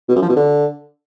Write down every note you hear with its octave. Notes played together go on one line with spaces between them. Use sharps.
B2
F#2
F3
B2
D3